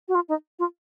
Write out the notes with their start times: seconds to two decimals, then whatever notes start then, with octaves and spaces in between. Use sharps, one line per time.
0.08 F#4
0.15 F4
0.29 D#4
0.59 F4